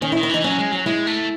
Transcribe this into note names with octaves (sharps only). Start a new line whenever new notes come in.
D#3 C#4
E4
D#3
E4
E3 D#4
F#3 C#4
G#3
F#3
G#3 E4
A3